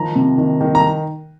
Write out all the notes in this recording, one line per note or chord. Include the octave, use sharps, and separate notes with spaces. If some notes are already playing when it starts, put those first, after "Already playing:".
Already playing: D#3 F3 A#5
C3
D#3
D#3
A#5